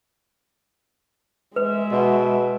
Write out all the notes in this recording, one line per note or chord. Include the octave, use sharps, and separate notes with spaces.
G#3 B4 E5
B2 D#5 F#5